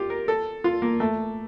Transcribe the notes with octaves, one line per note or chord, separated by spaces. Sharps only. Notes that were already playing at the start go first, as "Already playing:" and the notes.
Already playing: F4 G4
A#4
A4
F4
A#3
A3